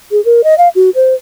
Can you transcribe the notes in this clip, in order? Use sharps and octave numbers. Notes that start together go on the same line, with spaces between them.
G#4
A#4
D#5
F5
F#4
C5